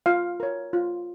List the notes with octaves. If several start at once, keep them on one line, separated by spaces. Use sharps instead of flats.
F4 F5
A#4 C#5
F4